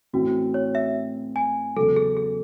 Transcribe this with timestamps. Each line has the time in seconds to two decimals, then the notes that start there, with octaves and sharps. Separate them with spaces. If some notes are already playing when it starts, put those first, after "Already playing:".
0.13 A2 E3 C4 F#4
0.54 C#5
0.75 E5
1.36 G#5
1.76 E2 C#3 F#3 A4
1.96 G#4
2.17 G#4